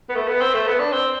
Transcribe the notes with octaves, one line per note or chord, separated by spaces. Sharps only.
B3
A3
B3
C4
A3
B3
D4
C4